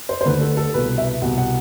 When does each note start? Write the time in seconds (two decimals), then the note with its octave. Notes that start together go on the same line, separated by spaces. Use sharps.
0.09 C5
0.21 C5
0.26 D2 D3 B4
0.41 A4
0.57 A4
0.74 C2 B2 B4
0.98 E5
1.22 C2 B2 F#5
1.38 F#5